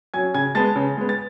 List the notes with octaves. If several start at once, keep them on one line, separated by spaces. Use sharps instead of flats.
F#3 C#4 G#5 G#6
C#3 G#5 G#6
G#3 B3 A5 A6
C#3
G#3 B3
A6